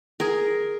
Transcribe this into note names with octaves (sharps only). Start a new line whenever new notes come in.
G#4 A#4